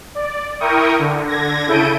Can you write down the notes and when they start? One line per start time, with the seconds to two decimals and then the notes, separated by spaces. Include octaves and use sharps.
0.15 D5
0.60 E4 A#4 G5 C#6 D#6
0.99 D3
1.27 D3 G#6 A#6
1.66 C#3 E4 A4 G6 D7 D#7